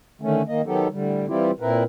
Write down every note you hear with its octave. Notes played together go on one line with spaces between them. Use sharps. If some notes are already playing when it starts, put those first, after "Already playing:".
D3 D#3 A3 C#4
D#3 A#3 D#5
D#3 F#3 B3 D#4 G4 A4
A2 D3 G3
E3 G3 C4 E4 F4 G4
A#2 C4 E4 A#4 B4